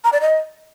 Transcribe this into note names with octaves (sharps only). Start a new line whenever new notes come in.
A#5
D5
D#5